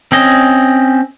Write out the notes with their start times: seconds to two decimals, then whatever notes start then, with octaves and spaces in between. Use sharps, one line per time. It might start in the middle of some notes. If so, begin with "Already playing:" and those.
0.12 C4 C#4 D#5